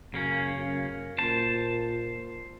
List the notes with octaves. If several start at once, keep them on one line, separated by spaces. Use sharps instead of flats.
F#2 C#3 A#3 C#4
F#2
A#2 C5 A5